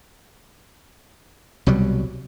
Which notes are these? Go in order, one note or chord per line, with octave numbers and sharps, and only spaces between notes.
C2 B2 F#3 G3